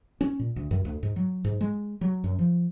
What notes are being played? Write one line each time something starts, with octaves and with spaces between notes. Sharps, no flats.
C#4
A#2
D2
F#2
D2
G#2
F#3
G#2
G#3
F#3
F#2
F3